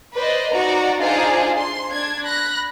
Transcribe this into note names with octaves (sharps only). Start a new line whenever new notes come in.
B4 C5 D5 D#5
D#4 F#4 D5 A#5
D4 D#4 F4 G#4 C5 D5
C6
D4 G#6
B5 F#6 A#6